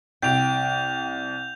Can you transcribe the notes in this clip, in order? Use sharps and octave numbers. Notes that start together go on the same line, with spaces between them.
C2 G5 G6 D7 F7